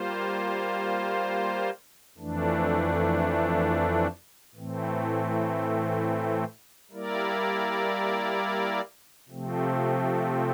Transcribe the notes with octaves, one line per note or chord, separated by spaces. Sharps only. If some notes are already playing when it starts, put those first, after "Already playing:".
Already playing: G3 A#3 F4 C5
F2 E3 A3 D4
A2 E3 A3 C4
G3 A#3 E4 A#4 D5
C3 F3 A3 C4